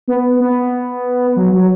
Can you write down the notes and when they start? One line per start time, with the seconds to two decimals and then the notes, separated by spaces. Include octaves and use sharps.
0.08 B3
0.40 B3
1.36 F#3
1.52 F#3